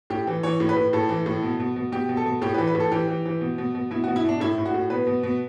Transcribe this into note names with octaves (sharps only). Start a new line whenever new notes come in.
A2 G4
E3
E3 C#5
A2
B4
A2
A2 A4
E3
A2
B2
B2
B2
B2 G4
B2
A4
B2
A2 G4
B4
E3
B4
A2
A4
E3 G4
E3
E3
B2
B2
B2
B2 E4
F#4
B2
E4
B2 D4
A2 E4
A2
F#4
A2
B2 B4
B2
B2